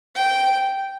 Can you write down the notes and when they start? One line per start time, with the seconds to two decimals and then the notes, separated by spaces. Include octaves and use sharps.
0.15 G5